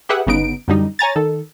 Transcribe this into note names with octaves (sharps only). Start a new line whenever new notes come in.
G4 G#4 B4 E5 F#5
G1 C#3 B3 D#4 D7
F#2 D3 G3 D#4
C#5 G#5 A#5 A6
D#3 A4